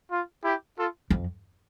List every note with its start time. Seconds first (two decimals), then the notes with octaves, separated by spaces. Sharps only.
0.10 F4
0.43 E4 G4
0.77 F4 A4
1.10 F2